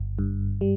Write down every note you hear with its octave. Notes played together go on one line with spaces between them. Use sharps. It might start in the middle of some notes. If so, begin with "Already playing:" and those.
Already playing: G1
G2
G3